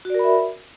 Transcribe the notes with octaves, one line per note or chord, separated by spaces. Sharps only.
F#4 A#4 D5 E5 B5